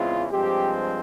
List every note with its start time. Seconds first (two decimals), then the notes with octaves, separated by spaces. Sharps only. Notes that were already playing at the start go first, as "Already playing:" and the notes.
Already playing: E2 C#3 E3 G#3 C4 F4
0.31 G2 F3 G#3 C4 G4